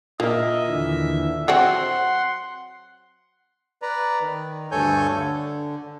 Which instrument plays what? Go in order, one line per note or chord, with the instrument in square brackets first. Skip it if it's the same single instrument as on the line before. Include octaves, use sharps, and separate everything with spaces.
[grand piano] A#2 A#4 [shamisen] A#3 [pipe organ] D#5 [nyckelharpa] E5
[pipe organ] D#2 D3 E3
[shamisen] F#3 C4 F#4 [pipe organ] F#5 C6
[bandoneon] B4 D5 A#5
D#3
D2 G2 A4 C#5 G#5 G6
D3